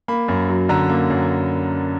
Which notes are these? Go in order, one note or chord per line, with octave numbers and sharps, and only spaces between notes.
A#3 B5
F#2
F#3
D3 A#5
A#3
F#2